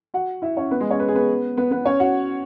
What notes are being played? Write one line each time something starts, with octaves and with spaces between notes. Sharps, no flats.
F#4 F#5
E4 E5
C#4 C#5
B3 B4
G#3 G#4
C#4 C#5
B4
G#4
B3 B4
B3 B4
B3 B4
C#4 C#5
F#4 F#5